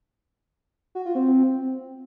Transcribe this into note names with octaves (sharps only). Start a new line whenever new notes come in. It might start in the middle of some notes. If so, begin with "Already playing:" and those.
F#4
F4
C4